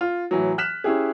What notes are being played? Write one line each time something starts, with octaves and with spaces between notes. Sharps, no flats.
F4
A2 E3 F#3
F6 F#6 B6 E7
C#4 E4 G4 G#4